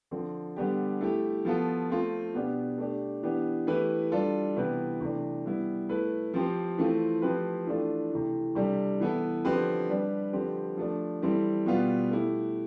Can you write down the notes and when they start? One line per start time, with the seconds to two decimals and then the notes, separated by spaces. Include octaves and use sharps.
0.11 D3 F3 C4
0.56 D3 G3 B3 D4 G4
1.01 A3 E4 G4
1.45 F3 B3 F4 A4
1.90 A3 C4 F4
2.34 B2 B3 D4 G4
2.78 A3 D4 G4
3.23 E3 B3 D4 G4
3.67 E3 A3 E4 G4 B4
4.12 G3 D4 F4 A4
4.56 C3 E3 B3 E4 B4
5.01 C3 E3 A3 D4
5.45 G3 B3 E4
5.89 A3 E4 B4
6.34 F3 C4 G4
6.78 E3 A3 C4 F4
7.22 F3 A3 C4 G4 B4
7.66 E3 A3 D4 F4 A4
8.12 C3 E3 A3
8.55 C3 G3 D4 A4
9.01 E3 B3 E4 A4
9.45 D3 F3 C4 G4 B4
9.89 G3 D4 G4 B4
10.33 D3 F3 C4 G4 B4
10.77 F3 A3 D4
11.22 E3 G3 C4 E4 A4
11.66 B2 G3 B3 F4
12.10 A3 E4 G4